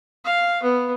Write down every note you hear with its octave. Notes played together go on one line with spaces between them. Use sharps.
F5
B3